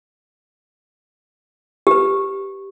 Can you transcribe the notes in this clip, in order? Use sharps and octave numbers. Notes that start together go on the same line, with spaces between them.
G4 B4